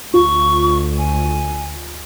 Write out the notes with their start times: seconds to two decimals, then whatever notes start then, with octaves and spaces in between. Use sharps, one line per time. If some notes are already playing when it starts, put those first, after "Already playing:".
0.14 D2 F4 C#6
0.98 G#5